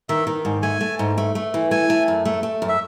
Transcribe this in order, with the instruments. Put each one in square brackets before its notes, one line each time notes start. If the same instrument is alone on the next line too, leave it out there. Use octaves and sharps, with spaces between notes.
[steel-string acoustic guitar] D#3 [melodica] E5
[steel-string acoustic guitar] D#3
G#2
[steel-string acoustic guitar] A3 [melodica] G#5
[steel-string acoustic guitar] A3
G#2
A3
A3
E3
[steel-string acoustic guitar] A3 [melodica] G#5
[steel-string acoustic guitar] A3
F#2
A3
A3
F#2
[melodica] E5